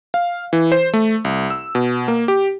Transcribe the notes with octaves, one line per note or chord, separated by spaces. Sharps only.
F5
E3
C5
A3
C2
E6
B2
A#3
G4